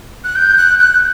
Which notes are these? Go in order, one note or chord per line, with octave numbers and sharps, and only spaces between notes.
F#6
G6
F#6
G6
F#6